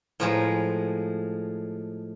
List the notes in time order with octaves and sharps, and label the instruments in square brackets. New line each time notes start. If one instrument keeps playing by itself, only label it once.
[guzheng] A2 F3 G#3 A#5